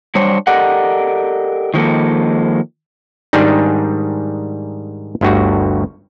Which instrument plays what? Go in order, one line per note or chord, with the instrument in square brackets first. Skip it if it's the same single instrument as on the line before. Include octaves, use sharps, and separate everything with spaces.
[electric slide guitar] F#3 G3 D4 C5 C#5
G4 A4 A#4 D5 D#5 F#5
D#3 F3 G#3 A#3 A4
[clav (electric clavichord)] G#2 D#3 G3 D4 D#4 G#4
G1 D2 G2 F#4